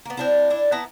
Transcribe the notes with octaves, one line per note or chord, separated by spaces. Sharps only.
A#3 B3
C4 D4 E4
D4 E4
B3 E4 A5 A#5